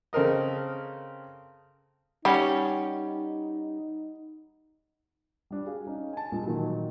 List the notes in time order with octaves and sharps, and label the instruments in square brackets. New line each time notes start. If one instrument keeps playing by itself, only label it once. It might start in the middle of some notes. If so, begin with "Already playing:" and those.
[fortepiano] C#3 C4 A4 A#4 D#5
[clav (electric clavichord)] G3 C#4 [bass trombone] D#4 [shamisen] G4 [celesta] F#5 B5
[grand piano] G3 D4
F#4 G#4 F5
C#4 D#4
G#5 A5
A#2 G3 G#3
A#2 D#3 E3 F#3 F4 F#4